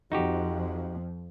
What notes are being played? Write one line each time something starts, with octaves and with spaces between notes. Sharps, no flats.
F2 F3 D#4 F#4 G4